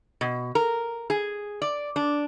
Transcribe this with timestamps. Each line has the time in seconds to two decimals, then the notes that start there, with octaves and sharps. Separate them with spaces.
0.21 B2
0.55 A#4
1.10 G#4
1.62 D5
1.96 D4